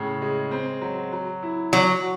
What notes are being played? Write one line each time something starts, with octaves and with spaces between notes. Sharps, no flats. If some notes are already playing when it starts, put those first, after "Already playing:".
Already playing: A2 C#3
G#3
C4
F#3
F#3
E4
F#3 F#4